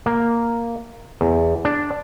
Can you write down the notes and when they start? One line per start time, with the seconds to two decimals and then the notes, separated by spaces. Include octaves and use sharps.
0.06 A#3
1.21 E2
1.65 D4